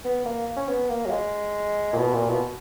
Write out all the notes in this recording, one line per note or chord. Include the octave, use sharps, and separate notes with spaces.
B3
A#3
C#4
B3
A#3
F#3
G#3
A#2
B2
A#2
B2